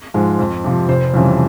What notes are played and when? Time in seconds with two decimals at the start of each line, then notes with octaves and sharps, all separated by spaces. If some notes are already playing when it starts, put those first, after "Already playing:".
0.14 G#2 F3 G#3
0.39 F2
0.64 C3 F3
0.89 F1 C5
1.14 F2 C#3 E3 G3